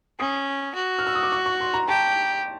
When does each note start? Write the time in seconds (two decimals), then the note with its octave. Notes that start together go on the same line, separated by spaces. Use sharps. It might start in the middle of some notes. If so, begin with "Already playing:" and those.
0.19 C#4 D#6
0.76 F#4
0.99 F6
1.07 E6
1.15 D#6
1.23 D6
1.32 C#6
1.46 C#6
1.61 C6
1.74 A#5
1.88 G4 A5